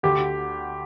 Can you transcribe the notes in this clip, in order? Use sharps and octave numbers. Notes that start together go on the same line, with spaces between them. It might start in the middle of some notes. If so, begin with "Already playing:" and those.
D2 D3 G4